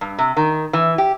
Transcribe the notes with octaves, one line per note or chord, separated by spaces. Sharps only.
G2
C3
D#3
E3
G4